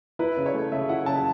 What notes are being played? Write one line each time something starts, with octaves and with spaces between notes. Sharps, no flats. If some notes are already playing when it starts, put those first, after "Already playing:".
E4 B4
C#3
C#5
A3
C#3 E5
E4 F#5
C#3 A5